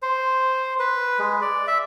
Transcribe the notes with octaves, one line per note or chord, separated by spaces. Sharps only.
C5
B4
G#3
D5
E5